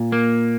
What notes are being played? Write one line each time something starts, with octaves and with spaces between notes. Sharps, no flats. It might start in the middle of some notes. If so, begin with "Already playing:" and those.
Already playing: A#2
A#3